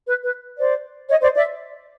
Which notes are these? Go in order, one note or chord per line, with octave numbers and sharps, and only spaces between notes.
B4
B4
C5 D5
C#5 D#5
C5 D5
D5 E5